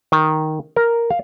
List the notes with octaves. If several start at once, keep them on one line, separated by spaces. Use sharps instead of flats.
D#3
A#4
F5